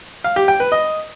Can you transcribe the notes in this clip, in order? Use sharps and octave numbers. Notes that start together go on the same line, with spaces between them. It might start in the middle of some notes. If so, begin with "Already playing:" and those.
F5
G4
G5
B4
D#5